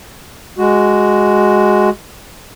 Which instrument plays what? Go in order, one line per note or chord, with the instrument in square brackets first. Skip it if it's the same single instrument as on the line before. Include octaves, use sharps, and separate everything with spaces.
[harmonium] G#3 F#4